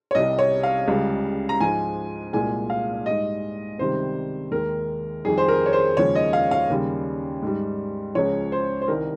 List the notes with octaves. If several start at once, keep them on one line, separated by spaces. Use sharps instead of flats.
C#5
C2 C3 G3 D#5
C#5
F5
C#2 C#3 G3
A#5
G#2 F3 G#3 G#5
C2 A#2 G#3 G#5
F5
G3 D#5
G#2
C#2 C3 D#3 G3 C5
D#2 D#3 G#3 A#4
F2 D#3 G3 G#4
C5
A#4
C#5
C5
D#2 C#3 F3 G#3 C#5
D#5
F5
F5
D#2 C#3 G3
G#2 G3
C#2 C#3 F3 C#5
C5
C5
C2 C3 D#3 G3 A#4